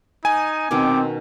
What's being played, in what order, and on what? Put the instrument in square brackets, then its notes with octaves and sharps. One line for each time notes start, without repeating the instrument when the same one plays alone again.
[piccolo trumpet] D#4 [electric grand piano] G#5
[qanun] B2 D#3 C#4 [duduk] C4 [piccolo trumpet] D6